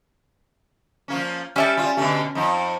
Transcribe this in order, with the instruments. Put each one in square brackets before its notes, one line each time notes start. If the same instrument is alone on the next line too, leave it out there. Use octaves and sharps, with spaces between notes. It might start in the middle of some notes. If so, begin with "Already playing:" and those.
[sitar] F3 A#3 C#4
[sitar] G3 G4 [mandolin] C#4 E5 A5
[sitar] G3 F4
B2 D3 A3
F2 D#4